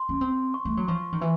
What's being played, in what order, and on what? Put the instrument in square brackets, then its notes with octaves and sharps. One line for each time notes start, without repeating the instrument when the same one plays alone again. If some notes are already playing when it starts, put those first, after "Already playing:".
Already playing: [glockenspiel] C6
[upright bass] C#4
C4
[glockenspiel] C#6
[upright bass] A3
F#3
[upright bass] F3 [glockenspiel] C#6
[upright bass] D#3
E3